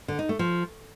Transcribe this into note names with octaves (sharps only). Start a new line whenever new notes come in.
D3
D#4
A3
F3